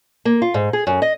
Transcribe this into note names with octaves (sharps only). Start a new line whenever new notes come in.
A#3
F4
G#2
G#4
F#2
D#5